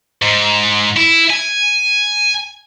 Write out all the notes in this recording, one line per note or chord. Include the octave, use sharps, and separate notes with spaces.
G#2
E4
G#5